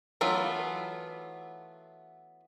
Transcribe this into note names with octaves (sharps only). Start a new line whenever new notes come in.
E3 F#3 A3 B3 F4